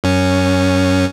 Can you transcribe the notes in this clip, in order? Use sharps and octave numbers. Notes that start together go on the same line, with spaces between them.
F#2 C#4